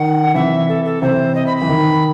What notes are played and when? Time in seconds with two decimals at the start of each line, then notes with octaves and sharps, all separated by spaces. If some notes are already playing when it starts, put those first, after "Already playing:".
Already playing: D#3 F#5
0.34 C3 E3 E5
0.69 A4
0.85 A4
1.02 C3 E3 C5
1.35 D#5
1.46 B5
1.57 E3 B5
1.69 D#3